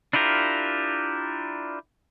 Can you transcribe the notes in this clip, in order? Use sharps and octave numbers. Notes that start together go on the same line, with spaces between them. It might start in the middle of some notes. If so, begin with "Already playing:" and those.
D4 E4 F4 G4 A#4